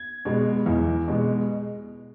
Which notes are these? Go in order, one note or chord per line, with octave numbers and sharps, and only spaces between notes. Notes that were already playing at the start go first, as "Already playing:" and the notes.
Already playing: G#6
B2 G#3
E2
B2 G#3